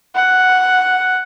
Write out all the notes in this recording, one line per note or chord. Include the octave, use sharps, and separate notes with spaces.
F#5